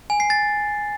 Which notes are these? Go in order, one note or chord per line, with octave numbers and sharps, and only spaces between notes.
G#5
C7
A6